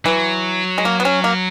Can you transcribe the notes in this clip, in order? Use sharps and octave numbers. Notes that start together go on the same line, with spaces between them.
E3 F#3
G#3
A#3
B3
C#4
A#3